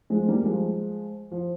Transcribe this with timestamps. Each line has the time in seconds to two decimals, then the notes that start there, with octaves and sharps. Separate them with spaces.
0.10 F3 G#3
0.28 G3 A#3
0.45 F3 G#3
1.31 F3